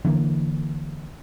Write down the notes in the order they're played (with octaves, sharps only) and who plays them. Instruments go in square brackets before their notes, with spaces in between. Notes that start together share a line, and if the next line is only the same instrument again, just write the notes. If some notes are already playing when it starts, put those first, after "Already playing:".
[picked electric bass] D3 E3 G#3 A#3